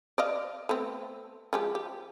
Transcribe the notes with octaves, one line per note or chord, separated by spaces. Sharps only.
D5 D#5 F5
A3 B3 C4
F3 G#3 G4
G4